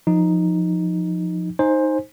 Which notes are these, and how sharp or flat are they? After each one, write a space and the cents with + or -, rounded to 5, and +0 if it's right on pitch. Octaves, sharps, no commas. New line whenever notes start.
F3 +10 D#4 +0
D#4 +0 C5 +15 G#5 +0